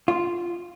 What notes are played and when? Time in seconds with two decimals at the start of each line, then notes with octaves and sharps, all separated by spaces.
0.08 F4